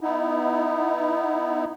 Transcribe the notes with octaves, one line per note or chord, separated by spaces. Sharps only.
B3 D#4 E4